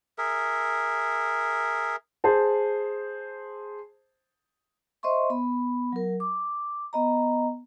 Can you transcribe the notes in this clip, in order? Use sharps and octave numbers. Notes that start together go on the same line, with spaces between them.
G#4 A#4 E5
G#4 C5 A5
C5 D#5 E5 C6 C#6
B3 B5
F#3 A#4
D6
B3 D#5 A#5